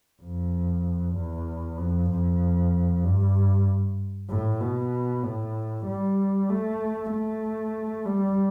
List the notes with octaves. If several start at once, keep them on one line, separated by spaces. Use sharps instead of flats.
F2
E2
F2
F2
G2
A2
B2
A2
G3
A3
A3
G3